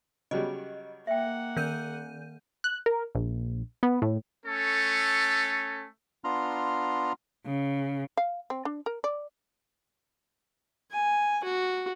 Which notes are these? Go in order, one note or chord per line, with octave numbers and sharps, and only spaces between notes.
C#3 F#3 G3 D#5
A#3 E5 F#5 G5
D#3 A#4 G6 D#7
F#6
A#4
A#1
B3
A2
A3 C#4 A4
B3 D4 F4 A#5 C6 F6
C#3
F5
C4
D4
A#4
D5
G#5
F#4